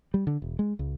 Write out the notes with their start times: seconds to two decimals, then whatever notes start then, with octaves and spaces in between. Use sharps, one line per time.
0.14 G3
0.27 D3
0.42 E1
0.59 G#3
0.79 C#2